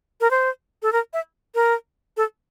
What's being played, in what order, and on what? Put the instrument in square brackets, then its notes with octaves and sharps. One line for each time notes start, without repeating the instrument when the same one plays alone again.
[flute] A#4
C5
A4
A#4
E5
A#4
A4